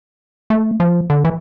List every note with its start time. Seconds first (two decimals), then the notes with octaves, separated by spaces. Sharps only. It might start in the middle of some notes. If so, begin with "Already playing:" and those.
0.50 A3
0.80 F3
1.10 D3
1.25 E3